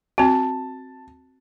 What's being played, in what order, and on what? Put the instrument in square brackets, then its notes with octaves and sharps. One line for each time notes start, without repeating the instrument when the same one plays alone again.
[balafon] C4 F#4 [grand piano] A5